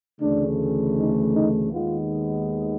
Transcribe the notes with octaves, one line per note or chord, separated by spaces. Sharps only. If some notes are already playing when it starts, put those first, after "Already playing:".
D2 C#3 E3 A3 D4
D#4
D#4
D#2 D#3 G#3 B3 F4